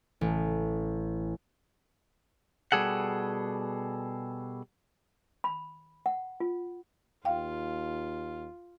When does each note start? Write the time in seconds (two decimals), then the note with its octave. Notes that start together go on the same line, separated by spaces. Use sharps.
0.21 A1
2.72 B2 G3 G#4 A4 F#5
5.44 B5
6.06 F#5
6.40 F4
7.25 D#2 F4 F5 G5